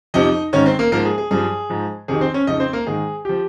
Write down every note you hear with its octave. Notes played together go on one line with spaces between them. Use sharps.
F2 C3 F3 D#4 D#5
G#2 D#3 C#4 C#5
C4 C5
A#3 A#4
G#2 F3 A#3 A#4
G#4
G#4
G2 F3 G#4
G#2 F3
F2 C3 D#3 G#4
C4 C5
C#4 C#5
F2 C#3 F3 D#4 D#5
C4 C5
A#3 A#4
G#2 D#3 G#4
F3 G4